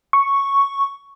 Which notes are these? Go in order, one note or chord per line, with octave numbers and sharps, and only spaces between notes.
C#6